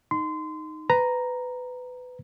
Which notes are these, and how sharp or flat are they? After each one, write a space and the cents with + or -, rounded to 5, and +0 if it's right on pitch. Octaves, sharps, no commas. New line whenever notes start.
D#4 +0 C6 -25
B4 +20 A#5 +0